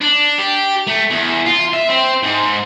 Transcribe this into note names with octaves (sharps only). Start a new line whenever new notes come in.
D4
G4
A3
E2
F4
E5
C4
G#2